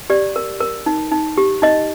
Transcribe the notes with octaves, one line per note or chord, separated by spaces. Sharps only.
G4 D5
A#4
A#4
D#4
D#4
G4
D#4 D#5